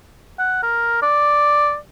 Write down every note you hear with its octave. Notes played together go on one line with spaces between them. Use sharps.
F#5
A#4
D5